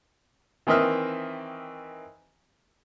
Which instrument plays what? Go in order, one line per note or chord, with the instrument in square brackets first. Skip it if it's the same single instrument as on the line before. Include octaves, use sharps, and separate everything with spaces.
[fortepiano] D#3 E3 C4 D#5 E5 F6